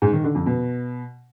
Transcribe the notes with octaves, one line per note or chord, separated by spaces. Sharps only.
G#2
D#3
D3
F2
B2